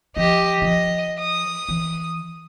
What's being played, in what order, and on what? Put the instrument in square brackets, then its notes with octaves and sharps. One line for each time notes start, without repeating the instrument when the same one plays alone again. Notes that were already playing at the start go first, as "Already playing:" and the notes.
[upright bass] F3 [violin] G4 D#5
[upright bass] F3 [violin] D#5
[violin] D#6
[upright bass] E3